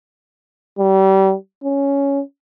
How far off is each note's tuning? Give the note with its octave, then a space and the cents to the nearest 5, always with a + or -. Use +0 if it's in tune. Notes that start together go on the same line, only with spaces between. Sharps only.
G3 -30
C#4 +5